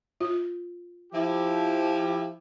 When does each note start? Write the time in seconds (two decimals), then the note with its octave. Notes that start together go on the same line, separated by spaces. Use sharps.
0.21 F4
1.13 F3 E4 G4